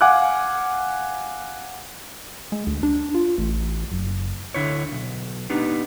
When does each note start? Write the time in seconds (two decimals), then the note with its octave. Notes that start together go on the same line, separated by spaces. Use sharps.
0.01 F5 F#5 G#5 D6 F6 F#6
2.52 G#3
2.67 D2
2.83 D4
3.15 F4
3.38 A1
3.92 F#1
4.54 D2 D3 E4 C#5
4.92 B1
5.50 B3 D4 D#4 G4